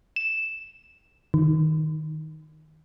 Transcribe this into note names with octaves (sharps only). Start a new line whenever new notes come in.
E7
D#3